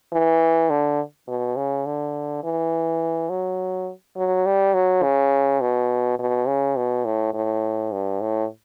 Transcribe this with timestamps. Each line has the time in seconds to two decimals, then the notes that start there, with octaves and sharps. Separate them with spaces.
0.13 E3
0.70 D3
1.28 B2
1.57 C#3
1.86 D3
2.44 E3
3.30 F#3
4.17 F#3
4.46 G3
4.75 F#3
5.03 C#3
5.61 B2
6.19 B2
6.47 C#3
6.76 B2
7.05 A2
7.34 A2
7.92 G2
8.21 A2